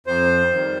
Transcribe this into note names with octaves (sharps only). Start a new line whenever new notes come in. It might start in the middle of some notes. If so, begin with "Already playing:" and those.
F2 C5
D#3 G3